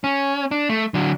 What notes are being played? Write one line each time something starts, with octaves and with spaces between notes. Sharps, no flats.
C#4
D4
A3
D3 F#3